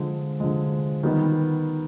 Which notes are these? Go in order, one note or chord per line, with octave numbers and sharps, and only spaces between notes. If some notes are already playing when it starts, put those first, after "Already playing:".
Already playing: D3 F3 G#3
D3 F3 G#3
D#3 G3 B3 D#4